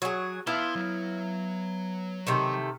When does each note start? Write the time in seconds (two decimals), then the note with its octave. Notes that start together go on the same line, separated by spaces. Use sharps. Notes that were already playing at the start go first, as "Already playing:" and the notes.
0.02 F#3 G#4
0.47 B3 E4 F5 A5 C6
0.75 F#3
2.27 C3 D#3 A3